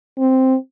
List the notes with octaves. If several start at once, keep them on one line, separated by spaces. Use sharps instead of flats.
C4